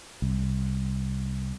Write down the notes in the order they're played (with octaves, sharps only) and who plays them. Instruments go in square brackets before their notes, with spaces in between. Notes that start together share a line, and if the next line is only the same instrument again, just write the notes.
[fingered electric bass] C2